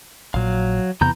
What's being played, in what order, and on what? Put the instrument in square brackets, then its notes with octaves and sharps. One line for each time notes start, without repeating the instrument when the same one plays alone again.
[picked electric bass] A#1 A#2 [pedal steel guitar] F#3 F5
[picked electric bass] E2 C3 B3 [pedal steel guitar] E3 A#5 G6